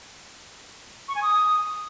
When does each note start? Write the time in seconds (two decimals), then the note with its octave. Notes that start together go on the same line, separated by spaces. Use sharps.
1.08 C#6
1.15 G#5
1.22 D#6